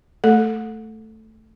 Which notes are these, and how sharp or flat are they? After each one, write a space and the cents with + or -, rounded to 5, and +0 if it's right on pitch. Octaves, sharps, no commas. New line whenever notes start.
A3 +0 A4 +0